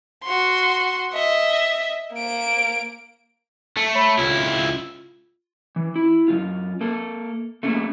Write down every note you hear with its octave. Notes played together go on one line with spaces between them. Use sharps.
F#4 C6
D#5 E5
A#3 D7
A3
C#5 B5
C#2 E4 F4
E3
E4
F#2 D#3 F4
A#3 A4
A3 A#3 C#4 F4 G#4